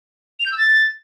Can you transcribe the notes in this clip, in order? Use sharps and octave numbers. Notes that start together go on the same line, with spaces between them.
F7
G6
E6
A6